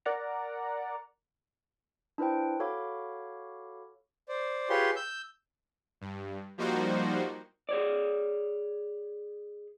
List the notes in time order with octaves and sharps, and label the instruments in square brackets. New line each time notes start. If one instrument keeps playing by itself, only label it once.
[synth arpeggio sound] A#4 D5 F#5 A#5
[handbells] D4 E4 B4 C5 G5
F#4 A4 C#5 F5 B5 D6
[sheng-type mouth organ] C5 D5
F4 G4 G#4 B4 C#5 C6
E6 G6
[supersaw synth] G2
F3 G3 A#3 D#4 F#4 C5
[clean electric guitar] G#4 C#5 D5